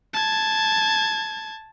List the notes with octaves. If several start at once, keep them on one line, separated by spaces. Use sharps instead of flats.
A5 G#6